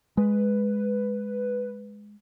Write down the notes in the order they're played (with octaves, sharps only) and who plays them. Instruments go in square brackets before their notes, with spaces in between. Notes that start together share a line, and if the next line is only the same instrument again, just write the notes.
[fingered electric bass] G#3 [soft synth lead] B4